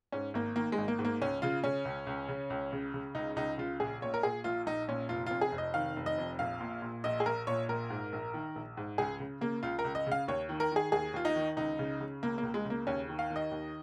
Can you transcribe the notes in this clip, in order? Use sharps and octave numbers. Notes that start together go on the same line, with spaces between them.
G#2 C#4
G#1 A#3
D#3 A#3
G#3
G#1
A#3
G#2
A#3
C#2 C#4
C#3 F4
C#3 C#4
C#2
C#2
C#3
C#2
C#3
C#3
C#2 D#4
C#2 D#4
C#3 F4
A#1 G#4
A#2 C#5
A#4
A#2 G#4
A#1 F4
A#1 D#4
A#2 C#4
F1 F4
F2 F4
G#4
F1
D#5
D#3 F5
F1
D#5
F2
A#1 F5
A#2
A#2
A#1 D#5
G#4
A#1 A#4
A#2 C#5
A#1 A#4
G#2
A#1
D#3
A#1
G#2
C#2 G#4
C#3
C#3 A#3
C#2 F4
A#4
C#2
D#5
C#3 F5
D#2 C#5
D#3
A#4
D#3 G#4
D#2 G#4
D#2 F4
D#4
D#3
C#2 D#4
C#3
C#3
C#2 A#3
A#3
C#2
G#3
C#3
A#3
D#2 C#4
D#3
F5
D#3
D#5
D#2